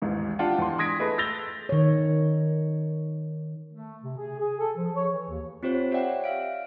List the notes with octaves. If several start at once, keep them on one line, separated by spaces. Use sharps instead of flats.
A1 D#2 G#2
D4 F4 G4 D5 F#5 A5
E2 C6
C6 D#6 G#6 A#6 B6 D7
A3 G#4 B4 D#5
E6 G6 A6 A#6 F7 G7
D#3 C#5
A3
C3
G#4
G#4
A4
F3
C#5
E3
D#2
C4 F4 G4 C5 C#5
G4 C#5 D5 E5 F#5 G5
E5 F5 D7